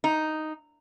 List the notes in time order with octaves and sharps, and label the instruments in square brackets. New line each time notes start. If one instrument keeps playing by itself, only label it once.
[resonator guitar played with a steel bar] D#4